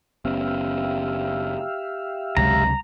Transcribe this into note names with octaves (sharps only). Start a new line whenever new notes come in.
F#1 B3 C#4 G4 E5 F5
G1 C#2 G2 C3 F#3 G#3 A#5